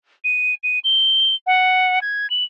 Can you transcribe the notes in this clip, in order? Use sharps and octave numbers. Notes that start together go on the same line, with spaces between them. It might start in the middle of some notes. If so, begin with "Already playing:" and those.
D#7
D#7
G7
F#5
G#6
F#7